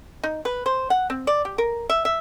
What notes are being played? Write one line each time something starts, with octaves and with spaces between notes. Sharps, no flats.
D#4
B4
C5
F#5
C4
D5
G4
A#4
E5
E5